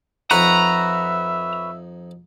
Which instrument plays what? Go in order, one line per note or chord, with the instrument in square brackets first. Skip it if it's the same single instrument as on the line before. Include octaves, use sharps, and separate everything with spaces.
[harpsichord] F2 D#4 D#6 [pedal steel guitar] B4 C#5 F#5 [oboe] E5 [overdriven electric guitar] A#5